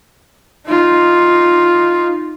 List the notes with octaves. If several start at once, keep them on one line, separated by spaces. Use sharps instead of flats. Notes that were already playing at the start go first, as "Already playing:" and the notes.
D#4 F4